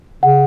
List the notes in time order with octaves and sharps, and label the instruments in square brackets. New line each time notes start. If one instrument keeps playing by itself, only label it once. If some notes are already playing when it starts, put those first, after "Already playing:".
[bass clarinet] C#3 [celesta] F#5